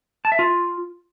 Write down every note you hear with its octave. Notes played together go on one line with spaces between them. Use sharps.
A5
E5
F4